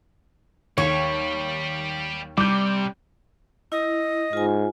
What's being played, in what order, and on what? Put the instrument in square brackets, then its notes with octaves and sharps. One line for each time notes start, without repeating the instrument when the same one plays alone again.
[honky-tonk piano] D#2 [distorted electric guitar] G3 [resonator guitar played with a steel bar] C#5
[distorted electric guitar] C3 [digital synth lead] G3 [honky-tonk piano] D6 G6
[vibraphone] E4 [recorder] D#5
[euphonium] G#2 [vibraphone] F4 G#5